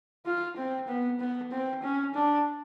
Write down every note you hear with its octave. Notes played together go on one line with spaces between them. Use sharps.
F4
C4
B3
B3
C4
C#4
D4